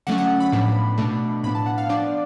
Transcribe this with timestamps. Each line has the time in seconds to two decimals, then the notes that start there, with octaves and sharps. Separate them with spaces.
0.07 D3 F#3 A3 C#4 F#5
0.18 F#5
0.40 B5
0.52 A2 F3 B3 D4
0.98 B2 A3 D4
1.44 A2 F3 B3 D4 B5
1.55 A5
1.66 F#5
1.78 F5
1.89 F3 B3 D4 D5